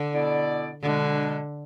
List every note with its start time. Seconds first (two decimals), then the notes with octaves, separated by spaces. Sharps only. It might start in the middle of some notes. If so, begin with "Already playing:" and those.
Already playing: D3
0.12 B2 B3 E4 A4 D5
0.82 B2 D3 G#3 D4